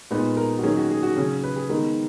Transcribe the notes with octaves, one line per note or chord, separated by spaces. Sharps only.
A#2 G#3 B3 D#4 B4
A#4
F#4
D#3 F#3 A#3 C#4 G#4
F#4
G#4
F#4
C#3 F#3 C#4 G#4
B4
G#4
D#3 G#3 B3 A#4